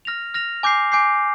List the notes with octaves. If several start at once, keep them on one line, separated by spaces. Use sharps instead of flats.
F6 A#6 F7
F6 A#6 F7
G#5 D6 G6 C7
G#5 D6 G6 C7